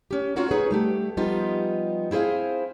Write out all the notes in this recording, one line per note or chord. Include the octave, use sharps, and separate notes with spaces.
C#4 G4
C4 C#4 F4 F#4 A#4 C#5
D#4 G#4 B4 C#5
G3 A3 G4
F3 G3 B3 D#4 F4 G4
C4 E4 G#4 C5 F5